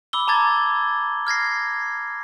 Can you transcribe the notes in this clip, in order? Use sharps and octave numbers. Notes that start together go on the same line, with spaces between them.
B5 D6 E6 G7
A5 A#5 D6 G#6 A6
F6 G#6 A#6 C7